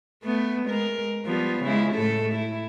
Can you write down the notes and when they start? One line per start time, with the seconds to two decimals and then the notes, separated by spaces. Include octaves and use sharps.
0.23 A3 B3
0.66 G#3 A#4
1.25 F3 G3 B3
1.64 C#3 G#3 E4
1.94 A2 A3 A4
2.34 E4